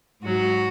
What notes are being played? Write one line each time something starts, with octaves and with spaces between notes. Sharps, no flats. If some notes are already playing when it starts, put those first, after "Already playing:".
G#2 F#3 F#4